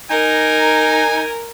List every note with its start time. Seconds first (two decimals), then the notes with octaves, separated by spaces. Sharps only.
0.11 D#4 A#4 G#5